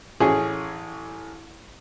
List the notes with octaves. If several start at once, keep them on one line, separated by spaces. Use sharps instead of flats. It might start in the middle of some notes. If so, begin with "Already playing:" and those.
A1 C#4 G#4